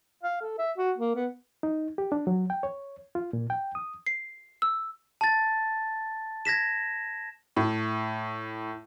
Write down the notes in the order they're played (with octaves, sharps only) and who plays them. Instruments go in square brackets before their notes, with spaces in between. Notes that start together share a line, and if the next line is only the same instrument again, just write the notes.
[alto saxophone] F5
A4
E5
F#4
A#3
B3
[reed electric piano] D#4
G4
D4
F#3
G5
C#5
F4
A#2
G5
D#6
[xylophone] C7
E6
[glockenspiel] A5 A6
G#6 A#6 B6 E7
[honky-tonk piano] A2